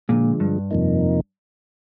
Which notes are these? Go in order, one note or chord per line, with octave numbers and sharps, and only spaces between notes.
A#2 D3 F3 G#3
G2
F2 C3 F3 A#3 D#4